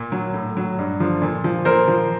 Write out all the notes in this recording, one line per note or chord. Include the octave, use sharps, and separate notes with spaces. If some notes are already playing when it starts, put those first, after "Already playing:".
Already playing: A#2
F#3
A2
F#3
G2
D3 F3
A#2
F3
A#2 A#4 C5
F3